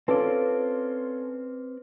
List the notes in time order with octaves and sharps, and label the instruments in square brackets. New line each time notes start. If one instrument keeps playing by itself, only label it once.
[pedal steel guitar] C4 D5 D6 [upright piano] C#4 F4 A4 [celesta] B4